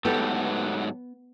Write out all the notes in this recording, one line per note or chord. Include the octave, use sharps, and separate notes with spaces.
G#2 F#3 A3 B3 G4 A4